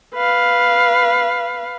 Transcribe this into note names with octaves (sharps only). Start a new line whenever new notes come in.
B4 F5